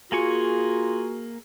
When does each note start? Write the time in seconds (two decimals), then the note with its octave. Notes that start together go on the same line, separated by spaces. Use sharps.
0.12 A#3 F4 F#4 G#4 G#5 C#6